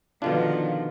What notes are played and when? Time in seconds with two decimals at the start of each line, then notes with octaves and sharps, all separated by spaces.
0.22 B2 D3 D#3 F3 D4 F4